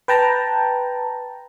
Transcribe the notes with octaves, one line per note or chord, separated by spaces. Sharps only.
B4 G5 A5 A#5